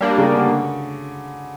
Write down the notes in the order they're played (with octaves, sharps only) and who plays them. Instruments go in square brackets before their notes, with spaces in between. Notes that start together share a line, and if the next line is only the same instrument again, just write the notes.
[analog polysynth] G3 A#3 D4
[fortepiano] C#3
D3